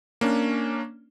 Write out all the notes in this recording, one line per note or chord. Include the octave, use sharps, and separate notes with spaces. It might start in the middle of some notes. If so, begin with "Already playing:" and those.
A#3 C#4 D4